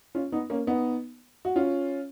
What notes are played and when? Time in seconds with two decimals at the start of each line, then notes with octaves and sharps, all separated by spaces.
0.15 C#4 F4
0.32 B3 D#4
0.50 A#3 C#4
0.67 B3 D#4
1.45 F#4
1.56 C#4 F4